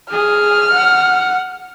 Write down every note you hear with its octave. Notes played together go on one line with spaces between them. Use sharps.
G#4 F6
F#5